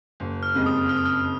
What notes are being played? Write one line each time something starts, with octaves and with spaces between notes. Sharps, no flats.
F#1
F6
F2 C#3 G#3
D#6
F#1 F6
D#6
F6